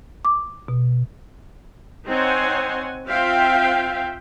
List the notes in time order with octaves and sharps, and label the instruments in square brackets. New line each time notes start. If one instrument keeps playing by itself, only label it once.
[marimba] D6
B2
[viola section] C4 D#4 C5 C#5 F#5 G#5
C4 F4 E5 F5 G5